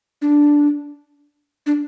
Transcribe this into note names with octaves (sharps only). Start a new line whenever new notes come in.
D4
D4